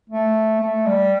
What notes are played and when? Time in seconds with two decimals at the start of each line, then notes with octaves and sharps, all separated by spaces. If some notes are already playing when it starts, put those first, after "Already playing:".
0.10 A3
0.61 A3
0.86 G3